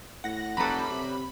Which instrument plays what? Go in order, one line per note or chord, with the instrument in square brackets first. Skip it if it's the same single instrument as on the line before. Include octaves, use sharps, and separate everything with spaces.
[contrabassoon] A2 [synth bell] F#5 A#6
[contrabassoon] F1 [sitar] F#2 G3 B4 [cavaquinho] A4 A#5 [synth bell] B5
[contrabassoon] C3